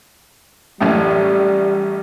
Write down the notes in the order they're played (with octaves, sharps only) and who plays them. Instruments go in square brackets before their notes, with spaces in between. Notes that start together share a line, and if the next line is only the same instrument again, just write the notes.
[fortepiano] A1 F#2 A2 [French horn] G3